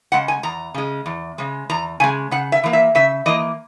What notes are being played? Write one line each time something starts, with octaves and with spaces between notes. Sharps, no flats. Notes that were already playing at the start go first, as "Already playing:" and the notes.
C#3 G#3 F#5
G#5
E2 A#5
C#3 G#3
E2
C#3 G#3
E2 A#5
C#3 G#3 G#5
C#3 F#5
E5
E3 A#3
E5
C#3 E5
E3 A#3 D#5